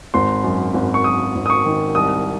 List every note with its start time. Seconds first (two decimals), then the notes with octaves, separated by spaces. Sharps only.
0.14 G#1 C6
0.44 F#2
0.74 G#1
0.94 C#6
1.04 F#2 D#6
1.35 G#1
1.46 D#6
1.50 C#6
1.65 D#3
1.95 C2 D#6